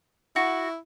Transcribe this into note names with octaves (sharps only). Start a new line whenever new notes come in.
E4 F#4